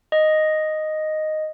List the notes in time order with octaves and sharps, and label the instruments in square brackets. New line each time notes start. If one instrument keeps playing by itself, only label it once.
[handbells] D#5